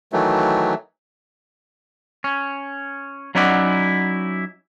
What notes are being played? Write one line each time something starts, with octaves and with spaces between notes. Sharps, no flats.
D#3 E3 F#3 A3
C#4
F#3 C#4 D#4 E4 D5 F#5